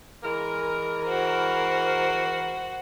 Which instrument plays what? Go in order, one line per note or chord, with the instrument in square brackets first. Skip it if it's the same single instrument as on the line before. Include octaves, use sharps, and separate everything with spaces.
[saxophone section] E3 G#3 A#4
[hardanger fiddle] F#4 C5